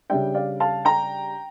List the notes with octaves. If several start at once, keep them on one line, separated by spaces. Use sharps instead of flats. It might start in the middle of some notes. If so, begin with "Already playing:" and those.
C#3 G3 D4 E5 G5
D5 F5
F5 A5
G5 A#5